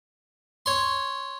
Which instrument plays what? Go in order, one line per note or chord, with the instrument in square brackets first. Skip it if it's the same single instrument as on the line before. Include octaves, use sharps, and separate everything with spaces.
[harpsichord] C#5 C6